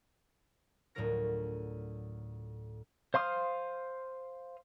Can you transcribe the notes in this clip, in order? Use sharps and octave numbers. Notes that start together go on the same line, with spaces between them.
D2 A2 F#3 F4 A#4 A#6
C5 F5 C6 D#6 F6